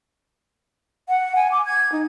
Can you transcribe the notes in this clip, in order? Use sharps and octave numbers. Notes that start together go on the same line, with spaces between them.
F#5
G#5
D6
G#6
D#4